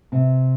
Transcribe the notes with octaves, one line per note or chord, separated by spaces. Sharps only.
C3